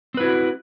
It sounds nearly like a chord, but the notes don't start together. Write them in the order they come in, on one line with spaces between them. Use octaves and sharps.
C4 B4 E4 F#4